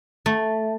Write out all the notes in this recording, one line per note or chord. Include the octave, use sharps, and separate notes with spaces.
A3